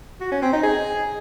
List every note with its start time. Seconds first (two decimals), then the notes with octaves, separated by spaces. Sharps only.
0.21 F#4
0.31 C#4
0.42 C4
0.53 D#4
0.63 G#4